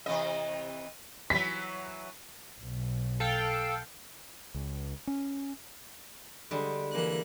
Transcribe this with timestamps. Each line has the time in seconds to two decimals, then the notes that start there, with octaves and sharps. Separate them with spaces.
0.06 C3 E3 D#5
1.30 E3 F#3 B6
2.60 B1
3.20 A4 F5 G5
4.55 C#2
5.07 C#4
6.51 D3 G3 G#3
6.92 E3 A#3 F#6